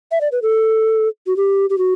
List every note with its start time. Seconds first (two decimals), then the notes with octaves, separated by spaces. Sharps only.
0.11 E5
0.21 D5
0.32 B4
0.42 A4
1.27 F#4
1.37 G4
1.70 G4
1.78 F#4